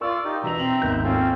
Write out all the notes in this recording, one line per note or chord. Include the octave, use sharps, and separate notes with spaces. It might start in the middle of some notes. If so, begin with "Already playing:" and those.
F4 A#4 D5 C#6 E6
D#4 G4
B2 E3 D4 E5 A#5 F7
C4 F#7
G#1 D#2 B3 G6
C4 C#4 F4 A4